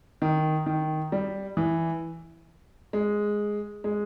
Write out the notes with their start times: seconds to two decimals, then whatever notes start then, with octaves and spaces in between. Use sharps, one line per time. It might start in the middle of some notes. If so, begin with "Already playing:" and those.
0.22 D#3
0.66 D#3
1.12 G3
1.57 E3
2.93 G#3
3.84 G#3